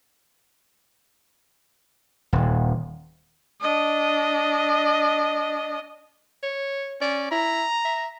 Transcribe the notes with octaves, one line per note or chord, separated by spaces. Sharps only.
D#1
D4 D#5
C#5
C#4 D5
E4 A#5
E5